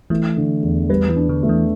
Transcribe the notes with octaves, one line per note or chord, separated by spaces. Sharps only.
E3 A3
D3
E2
G3 B4
E3
D4
D3
A3
E3